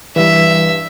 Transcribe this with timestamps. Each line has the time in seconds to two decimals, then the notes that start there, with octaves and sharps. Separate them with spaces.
0.16 G2 E3 G3 E5